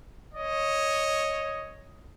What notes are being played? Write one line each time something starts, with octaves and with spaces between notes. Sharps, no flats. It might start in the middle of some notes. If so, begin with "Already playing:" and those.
C#5 D#5